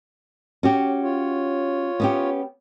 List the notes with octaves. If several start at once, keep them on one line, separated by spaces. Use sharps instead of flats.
C#4 F#4 G4
F4 C#5
B3 C#4 G4